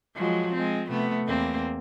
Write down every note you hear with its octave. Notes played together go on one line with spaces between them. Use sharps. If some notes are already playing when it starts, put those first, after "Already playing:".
F3 F#3 G#3
G#3 C4
C3 A3 B3
E2 A#3 C4